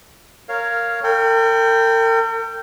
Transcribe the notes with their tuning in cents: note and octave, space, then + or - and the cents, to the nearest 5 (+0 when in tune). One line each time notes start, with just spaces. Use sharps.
A#4 -15 C#5 +0 F5 +0
A#4 -45 G5 +0 B5 +10